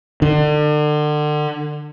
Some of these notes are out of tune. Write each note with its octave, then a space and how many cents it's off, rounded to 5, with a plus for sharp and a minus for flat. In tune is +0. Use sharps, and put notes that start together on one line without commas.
D3 +35